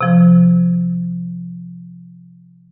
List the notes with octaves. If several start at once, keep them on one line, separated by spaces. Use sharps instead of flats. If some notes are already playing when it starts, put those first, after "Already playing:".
C3 F3